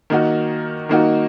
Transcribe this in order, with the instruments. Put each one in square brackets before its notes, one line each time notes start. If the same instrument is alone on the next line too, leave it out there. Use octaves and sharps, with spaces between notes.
[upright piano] D#3 A#3 D#4 F#4
D#3 A#3 D#4 F#4